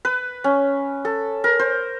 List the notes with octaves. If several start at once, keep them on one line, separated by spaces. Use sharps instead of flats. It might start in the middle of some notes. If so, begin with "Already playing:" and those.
B4
C#4
A4
A#4
C5